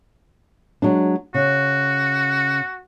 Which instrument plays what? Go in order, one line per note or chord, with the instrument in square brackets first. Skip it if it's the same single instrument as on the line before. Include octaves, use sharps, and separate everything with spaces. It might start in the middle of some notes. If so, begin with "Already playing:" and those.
[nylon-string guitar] F#3 G#3 D4
[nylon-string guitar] C#3 [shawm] F#4